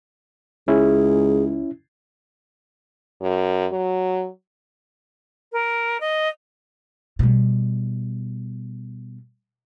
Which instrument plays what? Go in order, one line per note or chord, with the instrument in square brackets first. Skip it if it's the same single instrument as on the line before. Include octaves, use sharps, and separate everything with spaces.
[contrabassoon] C#2 [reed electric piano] C#4 E4 [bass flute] G#4
[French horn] F#2
F#3
[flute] A#4
D#5
[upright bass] B2 G3